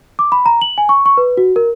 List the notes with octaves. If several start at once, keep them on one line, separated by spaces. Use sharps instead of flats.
D6
B5
A#5
F#7
G#5
C#6
C#6
B4
F#4
A#4